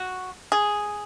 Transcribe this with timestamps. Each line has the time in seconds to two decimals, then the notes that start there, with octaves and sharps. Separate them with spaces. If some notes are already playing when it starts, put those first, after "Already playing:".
Already playing: F#4
0.52 G#4